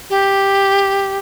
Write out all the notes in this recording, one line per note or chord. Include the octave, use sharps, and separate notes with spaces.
G4